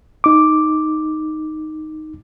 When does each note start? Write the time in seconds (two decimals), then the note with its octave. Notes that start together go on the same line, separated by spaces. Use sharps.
0.24 D#4 D6